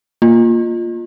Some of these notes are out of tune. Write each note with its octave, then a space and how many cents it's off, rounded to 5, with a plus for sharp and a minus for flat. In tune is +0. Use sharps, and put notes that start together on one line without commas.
A#3 +0 F4 +0